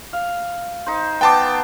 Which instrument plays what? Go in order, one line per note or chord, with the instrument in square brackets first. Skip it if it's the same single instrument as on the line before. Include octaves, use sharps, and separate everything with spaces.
[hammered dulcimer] F5
D#4 C5
[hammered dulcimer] B3 C6 [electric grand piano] G5 A5 D6